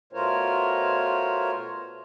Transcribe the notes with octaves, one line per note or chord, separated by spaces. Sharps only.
B2 A3 F4 A#4 C5 C#5